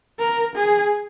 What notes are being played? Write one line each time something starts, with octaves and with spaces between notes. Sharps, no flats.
A#4
G#4